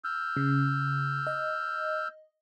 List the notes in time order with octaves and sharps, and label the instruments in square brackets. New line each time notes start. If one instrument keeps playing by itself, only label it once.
[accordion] E6 F6 G6
[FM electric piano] C#3
D#5